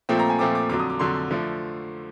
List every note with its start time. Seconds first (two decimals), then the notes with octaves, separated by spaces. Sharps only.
0.09 A#2 F3 A3 C4
0.19 A#5
0.30 G#5
0.39 A#2 F3 A3 C4 D6
0.55 D6
0.69 F2 D3 F#3 D6
0.80 D#6
0.90 D6
0.99 F2 D3 F#3 C6
1.31 D3 F3 A3